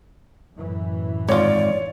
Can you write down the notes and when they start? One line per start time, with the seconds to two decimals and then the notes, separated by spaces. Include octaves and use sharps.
0.57 F#2 A2 E3
1.29 G#1 F4 C#5 D5